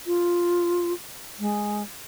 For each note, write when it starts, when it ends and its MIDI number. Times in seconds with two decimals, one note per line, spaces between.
0.07 0.93 65
1.39 1.82 56